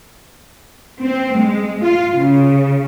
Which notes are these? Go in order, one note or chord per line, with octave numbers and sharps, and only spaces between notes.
C4
G#3
F4
C#3